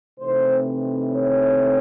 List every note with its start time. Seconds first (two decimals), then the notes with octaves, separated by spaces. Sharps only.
0.19 C3 E3 A3 C4 D#4 C5
1.09 C#5